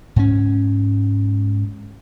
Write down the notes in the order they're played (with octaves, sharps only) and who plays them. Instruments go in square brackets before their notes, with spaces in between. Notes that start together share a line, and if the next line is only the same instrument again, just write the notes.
[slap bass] G#2 C#4